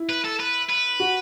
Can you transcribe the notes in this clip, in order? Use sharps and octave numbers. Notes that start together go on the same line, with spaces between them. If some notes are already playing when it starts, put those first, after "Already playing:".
Already playing: E4
B4
A4
B4
B4
F#4